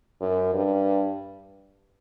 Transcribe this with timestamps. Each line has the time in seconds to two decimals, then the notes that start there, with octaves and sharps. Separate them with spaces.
0.21 F#2
0.54 G2